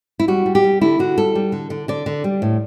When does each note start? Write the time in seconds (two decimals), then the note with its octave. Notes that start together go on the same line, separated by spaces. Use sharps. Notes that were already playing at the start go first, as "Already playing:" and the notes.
0.20 E4
0.28 G3 F#4
0.46 G3
0.55 G4
0.64 G3
0.81 D3 E4
0.99 D3 F#4
1.17 G3 A4
1.35 G3
1.52 D3
1.70 D3
1.88 D3 D5
2.06 D3
2.24 G3
2.42 A2